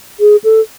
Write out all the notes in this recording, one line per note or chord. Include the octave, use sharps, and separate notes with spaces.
G#4
A4